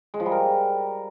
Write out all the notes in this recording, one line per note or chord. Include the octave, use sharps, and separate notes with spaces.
G#3
F3
G3
A#4